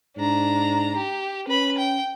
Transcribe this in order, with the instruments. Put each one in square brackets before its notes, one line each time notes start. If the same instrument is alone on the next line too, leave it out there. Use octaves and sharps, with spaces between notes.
[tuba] G#2 [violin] D4 A#5
[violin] G4
[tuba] C#4 [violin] B4 B5
[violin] G5